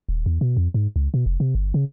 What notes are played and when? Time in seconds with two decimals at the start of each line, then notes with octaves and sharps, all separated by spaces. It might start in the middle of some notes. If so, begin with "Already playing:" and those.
0.09 D#1
0.26 E2
0.41 B2
0.57 F2
0.74 G#2
0.96 C#2
1.14 B2
1.26 F1
1.40 C3
1.55 G1
1.74 C#3